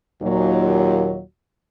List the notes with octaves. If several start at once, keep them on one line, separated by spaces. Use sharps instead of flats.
D#2 A#2 F#3